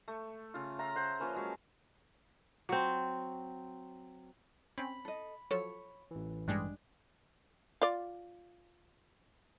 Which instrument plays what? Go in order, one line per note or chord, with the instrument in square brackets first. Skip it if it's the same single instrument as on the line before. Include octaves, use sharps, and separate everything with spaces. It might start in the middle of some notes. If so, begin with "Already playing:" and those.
[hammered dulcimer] A3
C#3 F4
F4 E5 A#5
C5 F#5
F3 A#3 C#4 B4
F#3 G#3
[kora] F#3 C4
[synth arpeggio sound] C4 C#4 [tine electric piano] B5
[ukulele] A4 D#5
[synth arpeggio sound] F3 F#3 A4 [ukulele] C#5
[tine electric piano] A1 E3
[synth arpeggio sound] G2 G3 G#3 [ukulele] D4
[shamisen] F4 D5